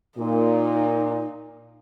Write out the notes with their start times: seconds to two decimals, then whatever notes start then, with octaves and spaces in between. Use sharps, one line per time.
0.18 A#2 D#4